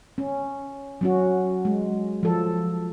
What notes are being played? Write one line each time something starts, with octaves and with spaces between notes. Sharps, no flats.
C#4
F#3 C#4 F#4
G#3
F3 A4